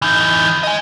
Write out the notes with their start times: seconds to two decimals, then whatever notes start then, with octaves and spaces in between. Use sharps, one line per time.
0.02 E3 D#4
0.63 D#5 G#5